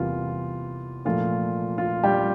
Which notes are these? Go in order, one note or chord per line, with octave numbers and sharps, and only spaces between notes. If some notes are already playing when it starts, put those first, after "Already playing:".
Already playing: E2 C3 G3 A#3 F4
A#2 F3 A3 F4
F4
G3 G4